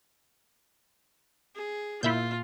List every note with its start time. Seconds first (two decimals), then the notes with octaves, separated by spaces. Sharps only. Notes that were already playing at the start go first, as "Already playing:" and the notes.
1.55 G#4
2.03 A#2 E4 F4 E5 G6